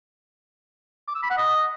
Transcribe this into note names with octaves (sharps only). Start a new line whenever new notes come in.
D6
E6
B5
F#5
D#5